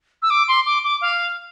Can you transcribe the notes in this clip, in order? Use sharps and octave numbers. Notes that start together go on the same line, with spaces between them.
E6
D6
C6
D6
D6
F5